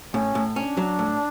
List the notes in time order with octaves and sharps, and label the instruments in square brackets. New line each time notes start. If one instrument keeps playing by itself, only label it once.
[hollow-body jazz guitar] A2 [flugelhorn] C#4
[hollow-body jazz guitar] A2
[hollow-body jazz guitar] C#4 [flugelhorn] D4
[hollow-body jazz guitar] F#3
A2